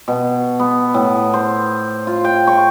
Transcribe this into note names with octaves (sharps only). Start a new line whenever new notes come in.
B2
B3
A2
C5
F4
G5
C#6